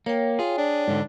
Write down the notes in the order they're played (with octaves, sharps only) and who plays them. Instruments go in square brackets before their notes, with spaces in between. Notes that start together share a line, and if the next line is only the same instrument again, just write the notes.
[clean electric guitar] A#3 [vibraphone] C#5 G5
[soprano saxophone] F4 [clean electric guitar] G#4
[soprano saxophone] D4
[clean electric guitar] G#2 D3